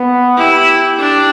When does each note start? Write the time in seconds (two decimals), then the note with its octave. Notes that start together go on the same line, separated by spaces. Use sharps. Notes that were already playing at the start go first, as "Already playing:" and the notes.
Already playing: B3
0.37 E4 G4
0.99 D4